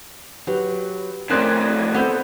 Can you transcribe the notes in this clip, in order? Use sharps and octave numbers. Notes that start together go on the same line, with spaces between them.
F#3 G4 B4
F2 A2 C4 C#4 A#4 D5 F#6 G#6
B3 C4 A4 G6